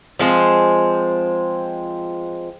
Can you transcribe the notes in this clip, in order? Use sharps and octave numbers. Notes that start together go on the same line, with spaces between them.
F3 G#3 C4